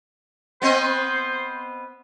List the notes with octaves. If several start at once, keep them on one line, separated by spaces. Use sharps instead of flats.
B3 C4 C5 D#5